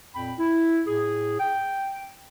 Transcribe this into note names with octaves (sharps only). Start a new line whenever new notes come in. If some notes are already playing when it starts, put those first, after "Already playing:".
F2 A#2 G5 B5
E4
A2 G#4
G5